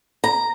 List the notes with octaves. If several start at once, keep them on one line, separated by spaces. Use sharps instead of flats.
A#5